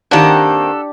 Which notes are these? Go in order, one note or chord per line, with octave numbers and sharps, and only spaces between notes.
D#3 A#3 C4 D4 G4 A4 D5 F#5